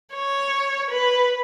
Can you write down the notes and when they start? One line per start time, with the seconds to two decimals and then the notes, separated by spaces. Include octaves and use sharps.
0.14 C#5
0.90 B4